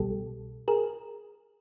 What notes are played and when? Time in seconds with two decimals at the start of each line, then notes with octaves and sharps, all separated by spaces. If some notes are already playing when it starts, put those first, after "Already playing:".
Already playing: C2 B2 G3 G4 A4
0.68 G#4 A#4